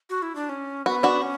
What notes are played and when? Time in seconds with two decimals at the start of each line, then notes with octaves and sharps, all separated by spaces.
0.10 F#4
0.22 E4
0.35 D4
0.49 C#4
0.86 B3 F#4
1.03 D4 F#4
1.22 C#4